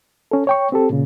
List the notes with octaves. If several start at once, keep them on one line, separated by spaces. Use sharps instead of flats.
C#4 A4
C#5 G5 C#6
C4 G4 A4
A#2 C#3